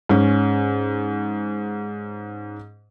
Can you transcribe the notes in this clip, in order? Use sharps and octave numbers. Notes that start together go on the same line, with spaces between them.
G#2 C#4